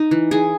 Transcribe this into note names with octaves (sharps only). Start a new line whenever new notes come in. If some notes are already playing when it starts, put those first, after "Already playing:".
Already playing: D#4
E3
E3 G#4